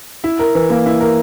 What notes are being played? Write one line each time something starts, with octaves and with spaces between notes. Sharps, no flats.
E4
A#4
E3
A#3
E4
A#4